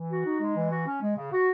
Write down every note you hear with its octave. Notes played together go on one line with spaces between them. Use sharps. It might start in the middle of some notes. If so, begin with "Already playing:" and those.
Already playing: E3
F#4
D#4
G#3
E3
F#4
C#4
G#3
C#3
F#4